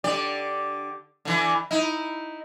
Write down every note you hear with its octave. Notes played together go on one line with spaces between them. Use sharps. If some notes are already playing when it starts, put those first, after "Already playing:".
D3 G4 D5
D3 E3
D#4 E4